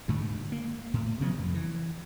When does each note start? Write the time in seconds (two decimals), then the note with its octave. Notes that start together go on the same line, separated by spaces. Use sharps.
0.08 D2 G#2 D3
0.52 A#3
0.94 A2
1.20 C3 F3 F#3 B3
1.39 F2
1.54 E3